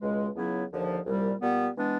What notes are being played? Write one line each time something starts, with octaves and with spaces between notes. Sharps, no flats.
C#2 B2 G#3
C#2 C#3 F#3 B3 E4
D#2 D3 F3
C2 A#2 G3
A#2 G3 B3
E3 G#3 B3 D4